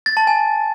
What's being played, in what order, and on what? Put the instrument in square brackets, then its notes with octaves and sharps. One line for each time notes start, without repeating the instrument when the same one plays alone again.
[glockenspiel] A6
A5
G#5